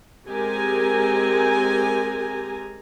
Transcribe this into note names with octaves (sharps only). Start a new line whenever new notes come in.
G#3 C4 G4 A#4 G#5 A#5